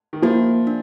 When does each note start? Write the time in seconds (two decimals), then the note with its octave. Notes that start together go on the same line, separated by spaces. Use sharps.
0.13 D#3
0.22 F3 A#3
0.67 D4